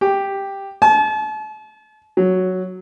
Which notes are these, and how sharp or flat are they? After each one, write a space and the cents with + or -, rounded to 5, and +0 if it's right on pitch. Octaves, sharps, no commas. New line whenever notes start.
G4 +5
A5 -40
F#3 +0